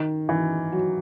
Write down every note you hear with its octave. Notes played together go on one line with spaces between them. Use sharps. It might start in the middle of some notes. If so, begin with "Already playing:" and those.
Already playing: D#3
E3
F#3